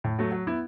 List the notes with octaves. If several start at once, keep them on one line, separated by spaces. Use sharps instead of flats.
A2
F#3 A3
F#3
B3 E4